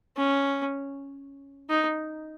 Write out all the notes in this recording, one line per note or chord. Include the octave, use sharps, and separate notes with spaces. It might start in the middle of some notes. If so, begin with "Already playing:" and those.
C#4
D#4